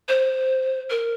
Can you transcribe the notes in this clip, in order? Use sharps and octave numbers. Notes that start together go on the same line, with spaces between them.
C5
A#4